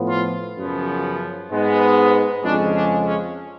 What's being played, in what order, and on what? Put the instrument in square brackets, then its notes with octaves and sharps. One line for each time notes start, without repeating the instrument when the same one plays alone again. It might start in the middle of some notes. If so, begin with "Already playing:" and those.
Already playing: [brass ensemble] A2 F3 B3
F4
F#2 C#3 F3 B3
G#2 G#3 B3
F2 C#3 G#3 C#4 D4
D4
C#4